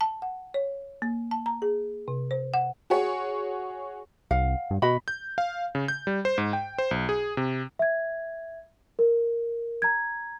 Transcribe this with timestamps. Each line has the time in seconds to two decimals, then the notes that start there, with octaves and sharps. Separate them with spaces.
0.01 A5
0.22 F#5
0.54 C#5
1.02 A#3
1.31 A5
1.46 A#5
1.62 G#4
2.08 C3
2.31 C5
2.54 F#5
2.90 F#4 G#4 C#5
4.31 C2 F5 F#5
4.70 G2
4.82 B2 F#4 D#5 B5
5.08 G6
5.38 F5
5.75 C#3
5.88 G6
6.07 G3
6.25 C5
6.38 G#2
6.53 G5
6.78 C5
6.91 B1
7.09 G#4
7.37 C3
7.79 E5 G#6
8.99 A#4
9.82 A#5 G#6